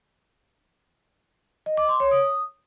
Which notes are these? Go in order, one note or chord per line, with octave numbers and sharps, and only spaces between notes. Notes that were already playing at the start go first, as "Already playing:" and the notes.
D#5
D6
C6
C#5
D#6